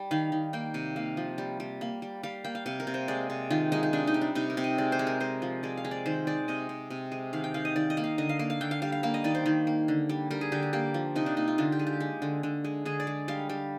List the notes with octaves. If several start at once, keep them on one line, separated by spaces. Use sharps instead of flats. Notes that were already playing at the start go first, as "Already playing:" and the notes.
Already playing: G3
D#3 F5
D#3
A#3 G5
C3
A#3 F5
F3
G3
G3
A#3
G3
G3 F5
A#3 G5
F5
C3 F5
A#4
C3
C5
G#3 D5
C3
D#3 F4
G#3 D#4
D#4
C3 D4
D#4
G3
D4
C3 D#4
A#4
C3
D#5
G#3 D5
C5
G#3
A#4
G#3 C5
F3
G#3 D5
F5
G#3
D5
D#3 C5
G#3 D5
C3 D#5
C3
C3
G#3
D#3 F5
G5
D#3 F5
D#5
D#3 D5
D#5
A#3
F5
D3 D#5
F5
A#3 F5
F5
D3 G5
F5
G3 F5
F5
A#3 F5
D#5
D#3 D5
C5
D#3
A#3
D3
G3
G3 A#4
G#4
D3 G4
G#4
A#3 G4
F3
C3 D#4
D4
A#3 D#4
F4
D3 F4
G4
G#3
G4
G#3
D3
D3
G#3
D3 G#4
D5
G#3
G3 F5
G3